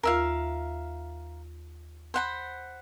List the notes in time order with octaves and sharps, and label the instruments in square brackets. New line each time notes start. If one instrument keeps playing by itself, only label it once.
[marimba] D#2 F4 [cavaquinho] A#4 E5 F5
[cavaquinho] C5 F#5 B5